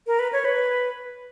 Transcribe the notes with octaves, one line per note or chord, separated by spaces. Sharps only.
A#4
B4
C#5
B4